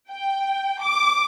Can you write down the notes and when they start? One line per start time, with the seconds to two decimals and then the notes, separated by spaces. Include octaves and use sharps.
0.11 G5
0.82 D6